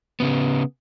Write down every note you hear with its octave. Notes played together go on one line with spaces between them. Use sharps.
C#3 B3